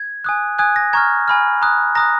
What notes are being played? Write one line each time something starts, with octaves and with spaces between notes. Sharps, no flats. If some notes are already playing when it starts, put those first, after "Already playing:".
Already playing: G#6
G#5 D#6 F#6
G#5 D#6 F#6 G#6
A#6
A#5 C#6 F6 G#6
G#5 B5 F6
A#5 D#6 F#6
A#5 D#6 F#6 A#6